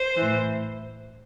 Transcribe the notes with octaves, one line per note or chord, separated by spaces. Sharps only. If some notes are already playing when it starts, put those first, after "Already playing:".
Already playing: C5
E3
A2